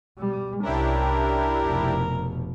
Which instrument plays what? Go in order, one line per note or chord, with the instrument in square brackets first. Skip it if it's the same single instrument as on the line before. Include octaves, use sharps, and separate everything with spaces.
[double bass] B2 G3
[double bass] C2 C#4 [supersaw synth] D4 E4 G4 [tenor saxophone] A#4
[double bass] F1 B2